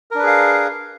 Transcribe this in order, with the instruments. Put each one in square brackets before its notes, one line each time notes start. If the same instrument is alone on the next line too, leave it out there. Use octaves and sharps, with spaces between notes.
[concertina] A#4
D4
B4
G#4
F5